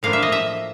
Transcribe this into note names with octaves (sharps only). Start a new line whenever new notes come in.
A2 F3 A#3 D4 F5
E5
D#5
E5